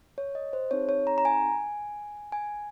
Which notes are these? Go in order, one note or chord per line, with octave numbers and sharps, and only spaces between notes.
C#5
D#5
C5
C4 D#4 G#4 C#5
C#5
A#5
A#5
G#5
G#5